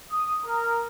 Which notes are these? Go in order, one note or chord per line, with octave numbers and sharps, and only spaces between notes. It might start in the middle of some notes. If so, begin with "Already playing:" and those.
D#6
A#4